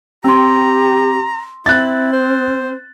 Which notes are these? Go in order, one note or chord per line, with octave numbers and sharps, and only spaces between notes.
C4 G4 A#5 C6 E6
C4 E4 F#6 A6
C5